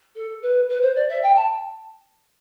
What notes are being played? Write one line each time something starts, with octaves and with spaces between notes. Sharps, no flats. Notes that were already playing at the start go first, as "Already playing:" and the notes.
A4
B4
B4
C5
D5
E5
G5
A5